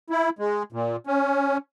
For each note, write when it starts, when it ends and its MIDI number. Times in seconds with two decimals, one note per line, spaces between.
0.10 0.29 64
0.39 0.63 56
0.72 0.96 46
1.07 1.57 61